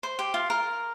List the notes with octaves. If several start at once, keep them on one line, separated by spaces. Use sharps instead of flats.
C5
G4
F4
A#4